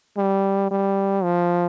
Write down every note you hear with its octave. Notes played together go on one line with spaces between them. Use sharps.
G3
G3
F3